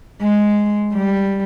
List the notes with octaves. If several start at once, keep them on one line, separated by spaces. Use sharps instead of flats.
G#3
G3